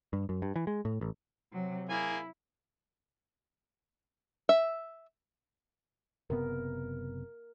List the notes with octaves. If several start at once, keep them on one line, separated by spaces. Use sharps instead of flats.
G2
F#2
G2
E3
G#3
A2
A1
C3 F#3
A#3 E4 G#4 G#5
E5
F#1 C3 B3 A#4